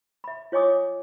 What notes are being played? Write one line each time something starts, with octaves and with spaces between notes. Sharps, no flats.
E5 B5
F4 C#5 D#5 G#5 D6 D#6